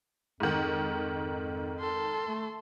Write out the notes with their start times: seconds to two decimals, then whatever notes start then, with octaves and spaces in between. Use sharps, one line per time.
0.40 F2 G#2 D#3
1.80 A4 C6
2.28 A3